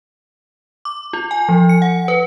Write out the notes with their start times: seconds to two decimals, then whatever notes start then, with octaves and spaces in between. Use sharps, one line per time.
0.85 D6
1.13 F4
1.31 G#5
1.49 F3
1.69 C#7
1.82 F#5
2.08 B4